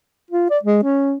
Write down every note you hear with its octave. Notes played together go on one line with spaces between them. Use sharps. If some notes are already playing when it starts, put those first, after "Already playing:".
F4
D5
G#3
C#4